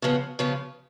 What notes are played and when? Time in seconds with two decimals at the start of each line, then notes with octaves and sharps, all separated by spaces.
0.02 C#3 F3 B3
0.39 C#3 F3 B3